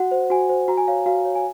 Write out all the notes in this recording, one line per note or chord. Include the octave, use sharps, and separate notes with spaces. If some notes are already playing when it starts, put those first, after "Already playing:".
Already playing: F#4 F#5
C5
F#4 G#5
C5
F#4 A#5
G#5
C#5 F5
F#4 F5
C#5
G#5